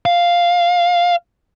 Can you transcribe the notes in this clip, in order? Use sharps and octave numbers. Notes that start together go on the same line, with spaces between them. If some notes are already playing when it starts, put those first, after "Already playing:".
F5